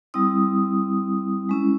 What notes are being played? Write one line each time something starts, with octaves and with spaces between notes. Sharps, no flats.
G3 C4 E4 D#6
G#3 C#4 E4